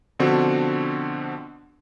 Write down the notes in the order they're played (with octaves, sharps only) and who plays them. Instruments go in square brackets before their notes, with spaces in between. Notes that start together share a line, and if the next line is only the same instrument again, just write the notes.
[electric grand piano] B2 D3 F3 C4 D4 F#4